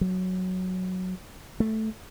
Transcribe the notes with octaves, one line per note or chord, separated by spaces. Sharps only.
F#3
A3